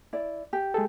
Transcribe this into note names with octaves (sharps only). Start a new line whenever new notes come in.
E4 D5
G4
G#3 G#4 A4